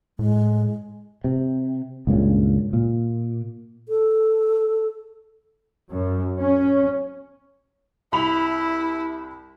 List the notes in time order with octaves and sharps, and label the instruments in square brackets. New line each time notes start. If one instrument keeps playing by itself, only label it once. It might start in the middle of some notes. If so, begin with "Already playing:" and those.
[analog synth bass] A2 [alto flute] G#3
[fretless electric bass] C3
C#2 G2 A#2 C#3
A#2
[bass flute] A4
[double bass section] F#2
C#4
[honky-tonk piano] C2 B5 F7 [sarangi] E4